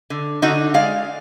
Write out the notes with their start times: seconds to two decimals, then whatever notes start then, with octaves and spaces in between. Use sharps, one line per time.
0.10 D3
0.42 D3 D#4 F#4
0.74 G#3 D5 F5